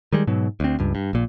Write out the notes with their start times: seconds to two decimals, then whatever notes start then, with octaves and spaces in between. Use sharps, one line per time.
0.12 D#3 G3 G#3
0.27 G#2 B2 F#3
0.60 D2 C4
0.79 C#2 G2
0.95 G2
1.13 A#1 A#2